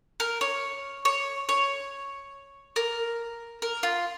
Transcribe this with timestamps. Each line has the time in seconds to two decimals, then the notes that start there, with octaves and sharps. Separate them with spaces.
0.20 A#4
0.41 C#5
1.05 C#5
1.49 C#5
2.76 A#4
3.62 A#4
3.83 F4